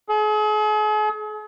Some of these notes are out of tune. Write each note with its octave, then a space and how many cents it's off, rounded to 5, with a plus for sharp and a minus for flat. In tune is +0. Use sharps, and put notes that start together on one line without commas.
G#4 +40